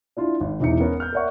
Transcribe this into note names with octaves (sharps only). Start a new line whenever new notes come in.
D4 E4 F4
G#1
E1 E2 D#4 E5 C#7
B3 C#4 A#4
F6 G6
A#4 C#5 D5 E5 F#5 C#6